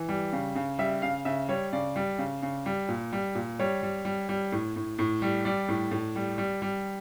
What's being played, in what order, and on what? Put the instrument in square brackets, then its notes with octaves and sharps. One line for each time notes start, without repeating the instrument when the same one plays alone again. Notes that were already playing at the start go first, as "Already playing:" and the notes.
Already playing: [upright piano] E3
G3
C#3
C#3
G3 E5
C#3 F5
C#3 E5
G3 C#5
C#3 D5
G3
C#3
C#3
G3
A#2
G3
A#2
G3 C#5
G3
G3
G3
A2
A2
A2
G3
G3 D5
A2
A2
G3
G3
G3